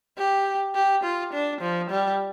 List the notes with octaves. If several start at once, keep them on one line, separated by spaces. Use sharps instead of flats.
G4
G4
F4
D4
F3
G3